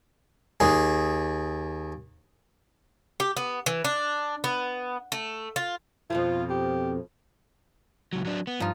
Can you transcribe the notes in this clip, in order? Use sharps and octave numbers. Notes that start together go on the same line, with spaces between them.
D#2 G#4
G4
B3
E3
D4
B3
A3
F4
F2 B2 F3 F4
G4
C#2 F#3
F#3 D4
B3
G2 F3 D#4 F4